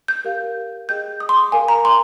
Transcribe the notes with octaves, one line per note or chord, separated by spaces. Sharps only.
G6
G4 A#4 F5
G#4 D#5 G5 G6
D#6
C6
D6
A#4 F5 G#5
A#5
C6